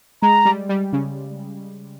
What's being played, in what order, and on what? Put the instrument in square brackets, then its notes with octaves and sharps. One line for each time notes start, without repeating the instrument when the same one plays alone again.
[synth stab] G#3 [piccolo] A#5
[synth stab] G3
G3
C#3